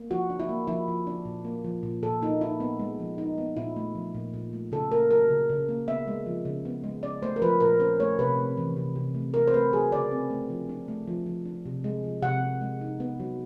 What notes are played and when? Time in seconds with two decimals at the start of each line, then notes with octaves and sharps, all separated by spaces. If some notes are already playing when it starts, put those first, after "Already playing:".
Already playing: A#3
0.11 F3 F#4
0.30 D4
0.40 E4
0.49 A#3
0.67 F3 E4
0.88 F3
1.07 D4
1.25 A#2
1.45 A#3
1.64 F3
1.83 A#2
2.03 A#2 A4
2.22 A#3 D#4
2.41 D#4 E4
2.60 B3
2.80 G#3
3.00 F3
3.18 D#4
3.38 B3
3.56 A#2 E4
3.76 A3
3.95 F3
4.15 A#2
4.34 A#2
4.53 A3
4.72 C#3 A4
4.92 A#3 A#4
5.11 F#3 A#4
5.30 C#3
5.49 C#3
5.69 A#3
5.88 B3 E5
6.08 G#3
6.26 F3
6.45 C#3
6.65 B3
6.84 G#3
7.03 C#4 D5
7.22 A3 C5
7.36 A#4
7.42 F3 B4
7.60 A#2 A#4
7.80 C#4 C5
8.00 A3 C#5
8.19 C3 B4
8.38 A3
8.57 E3
8.76 C3
8.95 C3
9.15 A3
9.34 C4 A#4
9.47 C5
9.54 A3 B4
9.73 F#3 G#4
9.92 C#3 D5
10.11 C4
10.30 A3
10.50 F3
10.69 D4
10.88 A3
11.07 F3
11.26 F3
11.46 D4
11.66 C3
11.84 G#3
12.04 F3
12.22 C3 F#5
12.42 C3
12.61 G#3
12.81 D#4
13.00 B3
13.20 F#3